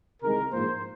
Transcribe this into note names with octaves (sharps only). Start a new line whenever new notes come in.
C2 C3 D#3 G#3 A#4
A#1 G#2 F3 A#3 C5